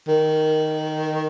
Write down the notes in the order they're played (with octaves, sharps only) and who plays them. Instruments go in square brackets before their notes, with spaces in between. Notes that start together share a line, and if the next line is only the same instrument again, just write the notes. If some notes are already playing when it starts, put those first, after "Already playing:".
[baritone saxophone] D#3